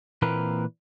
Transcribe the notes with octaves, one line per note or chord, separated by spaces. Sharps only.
A#2 E3 A#3 C4 A#4 B4